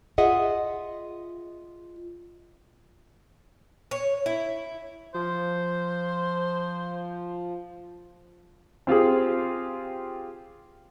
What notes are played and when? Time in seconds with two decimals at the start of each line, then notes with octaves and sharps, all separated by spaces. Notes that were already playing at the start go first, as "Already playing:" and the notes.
0.18 F4 G#4 D#5 E5 F#5
3.91 C#5
4.26 E4
5.14 F3 C5
8.87 C4 F4 G4 G#4